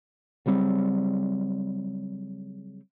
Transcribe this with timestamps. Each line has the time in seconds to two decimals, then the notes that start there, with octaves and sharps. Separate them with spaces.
0.46 C#3 F#3 G3 C4